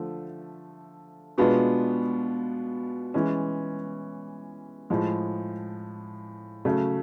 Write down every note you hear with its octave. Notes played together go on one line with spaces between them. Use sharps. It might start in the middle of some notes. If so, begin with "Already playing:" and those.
Already playing: D3 F3 A3
B2 G#3 B3 D4 F4
E3 G#3 C#4
A2 F3 G#3
C#3 F#3 A3